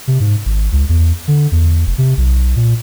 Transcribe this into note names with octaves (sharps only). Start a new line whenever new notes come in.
C3
G#2
G#1
C#2
E2
D3
E2
F1
C3
B1
A#2